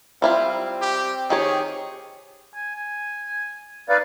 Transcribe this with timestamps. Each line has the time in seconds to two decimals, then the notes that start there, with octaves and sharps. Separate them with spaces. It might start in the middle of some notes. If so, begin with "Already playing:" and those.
0.22 G3 C4 E4 F4
0.82 G4
1.30 D#3 G4 G#4 C#5
2.54 G#5
2.75 G#5
3.89 D#4 B4 D5 F5